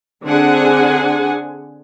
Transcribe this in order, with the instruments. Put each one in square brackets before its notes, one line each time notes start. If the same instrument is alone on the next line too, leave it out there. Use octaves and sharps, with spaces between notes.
[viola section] D3 C4 D4 G#4 F#5 G#5